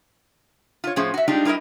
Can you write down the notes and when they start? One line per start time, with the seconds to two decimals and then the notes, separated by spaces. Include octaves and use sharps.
0.84 F4 C#5
0.96 A2 F3 C#4 G#4 C5
1.14 F#4 E5
1.28 G3 G#3 D4 D#4 F4 G4
1.45 G3 E4 A#4 B4 D#5